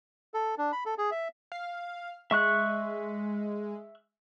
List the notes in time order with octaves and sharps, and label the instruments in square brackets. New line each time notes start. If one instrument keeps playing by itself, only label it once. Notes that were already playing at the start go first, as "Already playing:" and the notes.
[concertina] A4
D4
B5
A4
G#4
E5
[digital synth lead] F5
[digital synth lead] G#3 [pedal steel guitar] E5 C#6 F#6